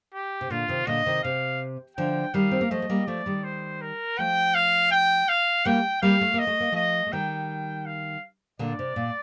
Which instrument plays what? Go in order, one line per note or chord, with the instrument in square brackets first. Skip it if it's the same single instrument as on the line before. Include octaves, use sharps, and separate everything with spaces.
[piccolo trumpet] G4
[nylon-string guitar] C3
[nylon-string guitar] A#2 D3 [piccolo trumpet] F4
[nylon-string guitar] C3 D#3
[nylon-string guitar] A#2 D3 [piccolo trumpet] D#5
[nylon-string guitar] C3 D#3
[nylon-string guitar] C3 [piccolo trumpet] F5
[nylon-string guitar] D3 F3 [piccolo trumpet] G5
[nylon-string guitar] D#3 G3 [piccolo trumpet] F5
[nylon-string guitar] C4
A#3
[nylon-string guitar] F3 A3 [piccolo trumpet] D#5
[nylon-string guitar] A3
G3 A#3
[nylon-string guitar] F3 A3 [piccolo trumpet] D5
[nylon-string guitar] D#3 G3
[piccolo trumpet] C5
A#4
[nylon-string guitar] F3 A3 [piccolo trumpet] G5
[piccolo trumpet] F5
G5
F5
[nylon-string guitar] G3 A#3 [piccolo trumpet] G5
[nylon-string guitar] G3 A#3 [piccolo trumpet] F5
[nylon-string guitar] A3
[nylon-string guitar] A#3 [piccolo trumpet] D#5
[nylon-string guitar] A3
A#3
[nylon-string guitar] F3 A3 [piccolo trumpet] D#5
[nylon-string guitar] A3
[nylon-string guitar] D#3 G3 [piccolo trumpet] G5
[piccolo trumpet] F5
[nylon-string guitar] A#2 D3 [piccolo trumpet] D5
[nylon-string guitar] C3
A#2